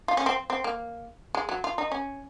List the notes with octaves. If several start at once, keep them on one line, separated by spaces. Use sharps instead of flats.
F4
C#4
C4
C4
A#3
G#3
F#3
F4
D#4
C#4